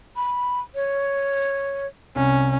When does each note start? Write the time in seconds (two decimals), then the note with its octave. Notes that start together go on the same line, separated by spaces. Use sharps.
0.16 B5
0.75 C#5
2.16 C2 C#4